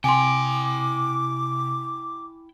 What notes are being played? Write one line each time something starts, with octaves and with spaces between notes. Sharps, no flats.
C3 E4 G5 G#5 C6 D6